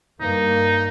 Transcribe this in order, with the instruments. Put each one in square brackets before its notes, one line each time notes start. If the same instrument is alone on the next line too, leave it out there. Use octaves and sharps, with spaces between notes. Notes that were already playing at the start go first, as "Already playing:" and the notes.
[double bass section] G2 A#3 [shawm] D#4